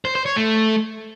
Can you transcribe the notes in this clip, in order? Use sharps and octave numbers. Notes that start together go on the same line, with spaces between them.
C5
C5
C#5
A3